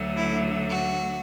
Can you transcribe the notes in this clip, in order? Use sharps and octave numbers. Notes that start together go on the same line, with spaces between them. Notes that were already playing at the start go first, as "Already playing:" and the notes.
Already playing: D2 D3 F#3 A3
E4
F#4